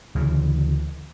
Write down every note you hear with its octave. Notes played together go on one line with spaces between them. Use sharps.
D2 C#3 E3